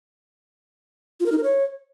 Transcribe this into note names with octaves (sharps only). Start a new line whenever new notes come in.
F4
A#4
D#4
A#4
C#5